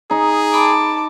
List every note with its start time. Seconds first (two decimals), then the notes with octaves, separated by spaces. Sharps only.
0.11 D#4 G#4
0.54 A5 B5 D6